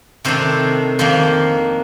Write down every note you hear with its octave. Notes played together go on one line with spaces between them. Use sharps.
C3 D#3 A3 D4 C5
F2 D#3 A#3 D4 C5